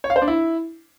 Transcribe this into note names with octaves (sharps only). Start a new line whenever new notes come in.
C#5
F5
C5
D4
E4